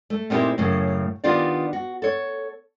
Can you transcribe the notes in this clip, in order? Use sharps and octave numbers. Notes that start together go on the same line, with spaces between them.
A3
A#2 B3 C4 D#4 E4 G4
F#2 A2 C#3
D#3 B3 D4 F4 G4 D5
F#4
A4 C#5